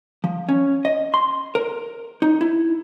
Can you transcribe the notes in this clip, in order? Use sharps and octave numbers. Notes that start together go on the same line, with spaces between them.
F3
C#4
D#5
C6
A#4
D#4
E4